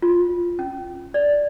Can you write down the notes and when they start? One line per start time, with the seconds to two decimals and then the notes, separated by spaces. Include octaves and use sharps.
0.02 F4
0.59 C#4
1.14 D5